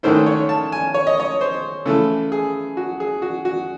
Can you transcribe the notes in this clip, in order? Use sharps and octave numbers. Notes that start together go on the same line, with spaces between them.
G#2 D#3 A3 C#4 E4 C5
C#5
A5
G#5
C#5
D#5
C#5
C5
C#3 E3 A3 A4
G#4
F#4
G#4
F#4
F#4